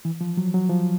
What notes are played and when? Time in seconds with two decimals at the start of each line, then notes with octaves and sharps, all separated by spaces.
0.05 E3
0.21 F3
0.37 F#3
0.54 F#3
0.69 F3